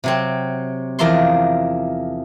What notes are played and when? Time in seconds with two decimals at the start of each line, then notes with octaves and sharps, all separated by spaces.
0.04 C3 F#3 C4
0.99 E2 F3 A#4 D5 E5 C6